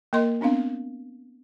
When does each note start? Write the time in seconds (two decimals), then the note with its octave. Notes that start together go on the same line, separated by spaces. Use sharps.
0.13 A#3 A#4 D#5 C6
0.41 B3 C4 D4 F5